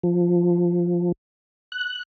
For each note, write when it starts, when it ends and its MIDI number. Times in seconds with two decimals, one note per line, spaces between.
0.03 1.12 53
1.72 2.03 90